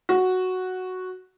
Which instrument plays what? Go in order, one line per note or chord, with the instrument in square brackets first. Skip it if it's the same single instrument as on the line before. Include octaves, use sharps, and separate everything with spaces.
[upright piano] F#4